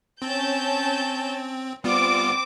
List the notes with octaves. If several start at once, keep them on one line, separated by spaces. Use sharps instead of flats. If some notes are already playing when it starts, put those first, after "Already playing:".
C4 C#4 A5 G6
G3 B3 C4 F4 D6